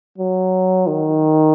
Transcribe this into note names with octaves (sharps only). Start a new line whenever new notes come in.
F#3
D#3